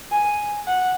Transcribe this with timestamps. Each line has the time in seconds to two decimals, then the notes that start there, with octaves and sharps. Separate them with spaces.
0.11 G#5
0.67 F#5